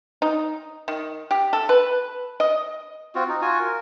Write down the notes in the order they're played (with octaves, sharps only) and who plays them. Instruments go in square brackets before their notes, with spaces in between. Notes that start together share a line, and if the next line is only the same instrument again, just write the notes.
[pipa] D#4
D#3
G4
A4
B4
D#5
[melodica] C4 F4 F#4
D#4
F4 F#4 G#5
A#4